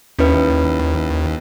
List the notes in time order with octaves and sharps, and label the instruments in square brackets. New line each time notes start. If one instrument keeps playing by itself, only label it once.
[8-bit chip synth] D#2 [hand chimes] C#4 E4 B4